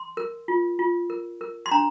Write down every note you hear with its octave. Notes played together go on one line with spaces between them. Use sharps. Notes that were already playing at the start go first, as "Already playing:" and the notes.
Already playing: C6
A#4
F4
F4
A#4
A#4
C6
D4 A#5